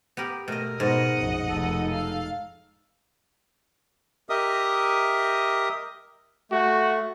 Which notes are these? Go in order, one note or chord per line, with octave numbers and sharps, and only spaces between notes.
B3 G4 A#4
B2 A3 A#4 D#5
G#2 B2 D#5 F#5
A#1 F#2
F1 D#4 A4
F5
G4 A#4 D#5 E5 D#6
A3 F#4